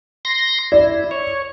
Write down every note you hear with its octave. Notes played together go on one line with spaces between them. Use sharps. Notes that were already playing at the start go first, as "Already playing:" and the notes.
C6 A#6
E4 D5
C#5